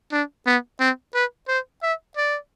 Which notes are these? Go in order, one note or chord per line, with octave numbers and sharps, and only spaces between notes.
D4
B3
C4
B4
C5
E5
D5